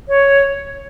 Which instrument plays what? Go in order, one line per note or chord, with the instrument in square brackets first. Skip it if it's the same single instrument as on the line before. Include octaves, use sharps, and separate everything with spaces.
[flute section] C#5